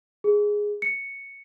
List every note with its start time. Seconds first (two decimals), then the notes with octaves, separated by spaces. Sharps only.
0.24 G#4
0.82 C#7